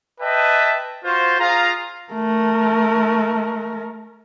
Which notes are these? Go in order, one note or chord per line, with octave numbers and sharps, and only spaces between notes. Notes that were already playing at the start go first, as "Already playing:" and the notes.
B4 D#5 E5 G5 A5
F4 F#4 C5
F4 G#4 F5 A#5
A3 A#4